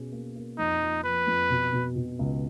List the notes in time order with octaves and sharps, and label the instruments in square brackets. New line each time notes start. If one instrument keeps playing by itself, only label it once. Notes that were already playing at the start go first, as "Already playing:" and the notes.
Already playing: [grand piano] B2 C#4 G#4
A#3
A#3
[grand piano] F2 [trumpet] D#4
[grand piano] F3
[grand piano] F3 [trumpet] B4
[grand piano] F2
B2
B2
B2
C#2